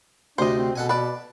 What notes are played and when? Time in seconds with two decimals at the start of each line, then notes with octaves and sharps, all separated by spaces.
0.38 D2 C3 D4 C5 D#5
0.57 C4
0.76 B2 A4 F#5 G#5
0.89 B4 D5 A5